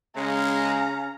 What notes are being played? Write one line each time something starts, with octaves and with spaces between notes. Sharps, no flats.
C#3 G#3 C#4 A#5